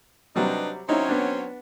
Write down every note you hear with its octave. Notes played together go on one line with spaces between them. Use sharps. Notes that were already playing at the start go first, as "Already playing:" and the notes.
C3 F#3 G3 D4 D#4 B4
F#3 C4 C#4 D#4 E4
B3 D4